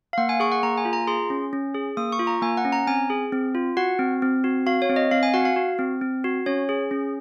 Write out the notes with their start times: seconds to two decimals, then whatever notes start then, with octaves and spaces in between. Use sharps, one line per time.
0.13 F5
0.18 A#3 F#5
0.29 G#5
0.40 G#4 C#6
0.52 F#5
0.63 A#3 A#5
0.78 G#5
0.85 F4
0.93 A#5
1.07 G#4 C6
1.30 C#4
1.53 C#4
1.75 G#4
1.97 A#3 D#6
2.12 C#6
2.19 F4
2.27 A#5
2.42 A#3 G#5
2.57 F#5
2.65 C#4
2.72 A#5
2.87 C4 G#5
3.10 G#4
3.32 C4
3.55 F4
3.77 F#4 F#5
3.99 C4
4.22 C4
4.44 F#4
4.66 F#4 F5
4.82 C#5
4.90 C4
4.96 D#5
5.11 C4 F5
5.23 G#5
5.34 F#4 F#5
5.45 F5
5.56 F#4
5.79 C4
6.01 C4
6.24 F#4
6.46 C#4 C#5
6.69 G#4
6.91 C#4